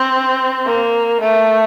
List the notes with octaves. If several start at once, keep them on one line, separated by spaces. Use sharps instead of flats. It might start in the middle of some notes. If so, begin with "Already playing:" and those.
Already playing: C4
A#3
A3